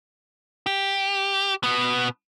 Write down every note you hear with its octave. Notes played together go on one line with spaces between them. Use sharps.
G4
B2 B3